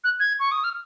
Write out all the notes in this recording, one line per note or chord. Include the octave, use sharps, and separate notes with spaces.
F#6
G#6
C#6
D#6
F6